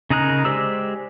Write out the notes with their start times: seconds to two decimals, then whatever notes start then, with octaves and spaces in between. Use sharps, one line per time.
0.10 C#3 D#4 G#4 A#4 F#6
0.45 G#3 G4 C5 D5 E6